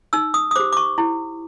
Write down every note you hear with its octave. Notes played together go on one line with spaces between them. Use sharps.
D#4 E6
D#6
D#6
G4 C5 D6
D6
C#6
E4